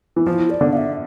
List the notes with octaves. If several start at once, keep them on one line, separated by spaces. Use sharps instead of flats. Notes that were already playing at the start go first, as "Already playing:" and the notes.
E3
F3 E4
D5
D3
F5
E5